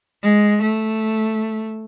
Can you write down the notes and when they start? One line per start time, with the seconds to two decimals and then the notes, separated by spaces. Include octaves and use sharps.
0.22 G#3
0.61 A3